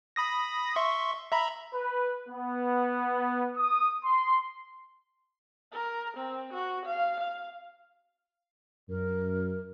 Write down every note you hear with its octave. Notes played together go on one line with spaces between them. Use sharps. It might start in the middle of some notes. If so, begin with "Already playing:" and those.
B5 D#6 A#6
E5 C6 C#6
E5 A#5 B5
B4
B3
D#6
C6
A#4
C4
F#4
F5
F5
F#2 A#4